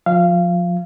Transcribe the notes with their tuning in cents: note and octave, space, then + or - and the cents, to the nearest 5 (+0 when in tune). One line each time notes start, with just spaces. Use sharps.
F3 +25 F5 -20